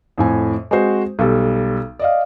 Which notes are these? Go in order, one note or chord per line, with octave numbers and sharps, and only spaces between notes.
F2 A2 G#5
G#3 C4 F#4 C5
B1 G3 A4
D5 D#5 F5